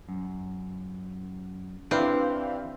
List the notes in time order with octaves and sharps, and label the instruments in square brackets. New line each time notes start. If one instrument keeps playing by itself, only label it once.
[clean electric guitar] F#2
[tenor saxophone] E3 [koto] C4 [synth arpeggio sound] D4 B4 F5 [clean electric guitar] E4 G4